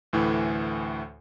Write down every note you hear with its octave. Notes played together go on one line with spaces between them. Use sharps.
D2 A2 E3